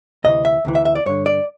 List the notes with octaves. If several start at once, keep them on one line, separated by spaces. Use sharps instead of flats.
D2 C3 E3 D#5
E5
D2 C3 E3
E5
E5
D5
G2 D3 C#5
D5